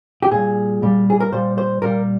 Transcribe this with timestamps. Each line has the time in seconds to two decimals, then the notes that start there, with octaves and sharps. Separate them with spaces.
0.23 G4
0.31 A#2 G3 G#4
0.82 A#2 G3
1.10 G#4
1.20 A#4
1.32 A#2 G3 C5
1.58 C5
1.82 A#2 G3 A#4